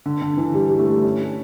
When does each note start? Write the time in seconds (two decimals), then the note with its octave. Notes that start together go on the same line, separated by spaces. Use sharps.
0.06 D3
0.22 D3
0.37 E3
0.54 G3
0.74 G3
0.78 A3
1.04 C#4